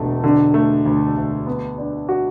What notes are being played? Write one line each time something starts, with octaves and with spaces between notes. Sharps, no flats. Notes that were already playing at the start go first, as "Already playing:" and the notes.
Already playing: E1 D3 A3
D3
A3
D2
D2
B3
D4
F#4